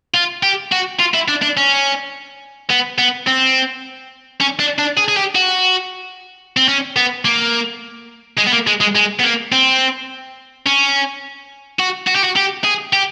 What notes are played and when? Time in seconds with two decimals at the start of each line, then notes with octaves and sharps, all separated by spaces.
0.15 F4
0.43 G4
0.72 F#4
1.00 F4
1.14 E4
1.28 D4
1.42 D4
1.57 C#4
2.70 B3
2.98 B3
3.27 C4
4.41 C#4
4.60 D4
4.79 D4
4.97 G#4
5.08 G#4
5.17 G4
5.35 F#4
6.57 C4
6.68 C#4
6.96 B3
7.25 A#3
8.38 G#3
8.47 B3
8.52 A#3
8.67 G#3
8.81 G#3
8.95 G#3
9.20 B3
9.24 A#3
9.52 C4
10.66 C#4
11.80 F#4
12.07 F#4
12.16 G4
12.24 F#4
12.36 G4
12.64 G#4
12.93 G4